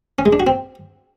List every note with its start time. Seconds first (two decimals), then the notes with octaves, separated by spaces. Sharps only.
0.19 C#4
0.26 G#3
0.33 D4
0.40 F#4
0.47 C4